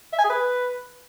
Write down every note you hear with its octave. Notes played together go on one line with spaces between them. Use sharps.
E5
G#5
G#4
B4